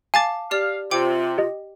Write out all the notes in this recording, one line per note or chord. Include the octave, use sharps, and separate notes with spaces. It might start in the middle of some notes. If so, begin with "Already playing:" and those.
F5 G#5 A5 D6 A6
G4 D5 F5
C3 F4 G5 D6
G4 D#5